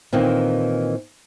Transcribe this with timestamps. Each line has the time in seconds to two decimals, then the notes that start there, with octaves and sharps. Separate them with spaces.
0.13 A#2 D#3 E3 C4